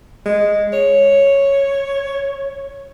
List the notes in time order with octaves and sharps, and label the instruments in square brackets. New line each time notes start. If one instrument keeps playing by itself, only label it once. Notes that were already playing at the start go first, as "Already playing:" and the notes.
[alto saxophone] G#3
C#5